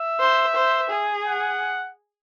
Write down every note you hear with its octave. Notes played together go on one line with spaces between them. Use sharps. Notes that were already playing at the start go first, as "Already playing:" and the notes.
Already playing: E5
C5
C5
G#4
F#5